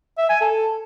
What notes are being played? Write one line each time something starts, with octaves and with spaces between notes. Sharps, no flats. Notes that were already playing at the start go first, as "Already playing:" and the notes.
E5
G#5
A4